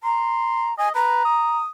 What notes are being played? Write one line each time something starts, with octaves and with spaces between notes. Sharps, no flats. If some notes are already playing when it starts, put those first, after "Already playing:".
A#5 C6
D#5 G#5
B4 A#5
D#6